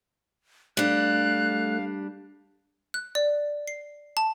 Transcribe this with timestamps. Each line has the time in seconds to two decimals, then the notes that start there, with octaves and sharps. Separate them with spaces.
0.77 G3 A3 D4 F5 F#6
2.94 F#6
3.15 D5
3.68 C7
4.17 A5